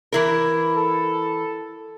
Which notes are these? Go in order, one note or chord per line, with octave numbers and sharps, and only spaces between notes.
E3 E4 A#4
A4